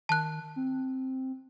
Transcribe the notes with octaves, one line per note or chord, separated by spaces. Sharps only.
D#3 A5 F#6
C4